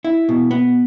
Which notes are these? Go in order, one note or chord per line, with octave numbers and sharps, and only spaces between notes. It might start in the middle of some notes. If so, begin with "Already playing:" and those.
E4
B2
B3